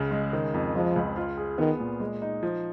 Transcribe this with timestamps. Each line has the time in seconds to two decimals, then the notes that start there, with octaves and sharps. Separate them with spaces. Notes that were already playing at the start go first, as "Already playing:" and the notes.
Already playing: C#2 C#3
0.11 G#3
0.33 D#3
0.54 F2
0.75 F3 G#3
0.96 C#2
1.16 F4
1.37 G#4
1.58 D#3 B3
1.80 A#2
2.00 G#3
2.22 D#4
2.43 F3